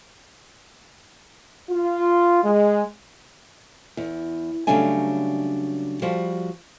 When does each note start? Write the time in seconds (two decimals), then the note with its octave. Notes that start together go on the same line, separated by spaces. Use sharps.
1.70 F4
2.44 G#3
3.97 E2
4.67 C#3 F#3 G3 A3 D4 G#5
6.02 F3 G3 F#4